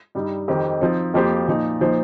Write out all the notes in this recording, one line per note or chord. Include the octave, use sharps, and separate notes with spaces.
G2 G3 D#4
F2 D#3 C4 G4
F3 C4 D#4
F2 F3 A#3 G4 C5
A#2 F3 D#4
A#2 F3 D#4 C5